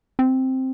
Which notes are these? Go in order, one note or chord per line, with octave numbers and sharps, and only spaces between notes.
C4